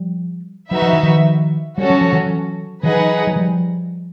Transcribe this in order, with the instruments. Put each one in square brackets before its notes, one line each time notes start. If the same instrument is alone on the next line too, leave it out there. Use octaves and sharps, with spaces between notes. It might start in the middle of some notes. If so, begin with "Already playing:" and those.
Already playing: [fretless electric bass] F3 G3
[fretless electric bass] F#3 [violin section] D#4 F#4 B4 E5
[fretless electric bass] F3
E3
D#3 F3
[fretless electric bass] G3 [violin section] C#4 F#4 A4 C#5
[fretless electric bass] F#3
F3
E3 F#3
[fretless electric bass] E3 F#3 [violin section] D#4 G#4 B4 D#5 F#5
[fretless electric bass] F#3
F3 G3